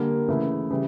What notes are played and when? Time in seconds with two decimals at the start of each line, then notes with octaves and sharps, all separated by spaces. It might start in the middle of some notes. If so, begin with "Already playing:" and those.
Already playing: D3 G3 A#3
0.28 C#3 E3 A3 E4
0.70 C#3 E3 G3